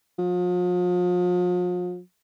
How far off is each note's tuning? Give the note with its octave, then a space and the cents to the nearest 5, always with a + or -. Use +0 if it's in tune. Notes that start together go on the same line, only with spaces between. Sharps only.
F3 +40